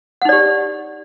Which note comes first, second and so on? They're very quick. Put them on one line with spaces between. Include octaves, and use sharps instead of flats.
F#5 D#4 D5 G4